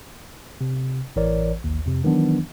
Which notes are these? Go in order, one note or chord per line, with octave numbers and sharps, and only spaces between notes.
C3
A1 E3 A#4 C#5 D5
A1 D#2
F2 C3
D#3 E3 F#3 B3 D4